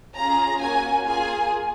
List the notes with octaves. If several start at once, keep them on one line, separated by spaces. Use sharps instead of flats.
C#4 F4 G#4 A#5
A#3 C#4 F#4 G#5
A#3 F4 G#4 G#5